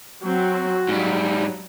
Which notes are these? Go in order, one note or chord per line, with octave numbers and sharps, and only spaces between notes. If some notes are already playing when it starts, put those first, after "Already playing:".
F#3 C4 F#4
G#2 F#3 G3